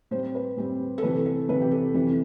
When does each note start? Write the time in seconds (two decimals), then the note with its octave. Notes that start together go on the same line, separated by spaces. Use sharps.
0.11 A2 G3 C4 C5
0.35 B4
0.57 A2 G3 C4
0.98 A4
1.02 C3 E3 A3 B4
1.26 A4
1.49 C3 E3 A3 B4
1.61 G4
1.71 A4
1.94 F2 C3 E3 A3 A4